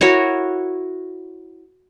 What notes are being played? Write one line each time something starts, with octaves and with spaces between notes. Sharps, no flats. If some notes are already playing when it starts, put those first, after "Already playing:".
E4 F#4 A#4 C#5